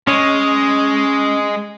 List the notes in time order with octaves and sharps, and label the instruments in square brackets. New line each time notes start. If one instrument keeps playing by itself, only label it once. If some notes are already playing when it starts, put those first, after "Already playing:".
[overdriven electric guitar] G#3 [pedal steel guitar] C#4 C#5 D#5